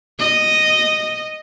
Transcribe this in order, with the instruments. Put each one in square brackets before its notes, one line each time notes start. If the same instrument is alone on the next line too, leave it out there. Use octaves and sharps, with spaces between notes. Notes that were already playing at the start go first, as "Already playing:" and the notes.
[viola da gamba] D#5